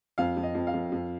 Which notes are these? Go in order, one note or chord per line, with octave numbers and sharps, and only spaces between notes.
F2 F5
F2
D#5
F2
F5
F2
F2